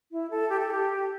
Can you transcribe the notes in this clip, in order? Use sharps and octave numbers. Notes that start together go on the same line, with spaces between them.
E4
A4
G4
A4
G4